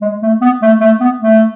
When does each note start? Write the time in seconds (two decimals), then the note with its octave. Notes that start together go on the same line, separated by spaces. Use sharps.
0.02 G#3
0.22 A3
0.41 B3
0.62 A3
0.81 A3
1.00 B3
1.20 A3